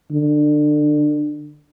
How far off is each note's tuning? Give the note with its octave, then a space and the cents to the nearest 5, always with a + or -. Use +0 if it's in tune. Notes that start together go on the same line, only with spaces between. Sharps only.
D3 +25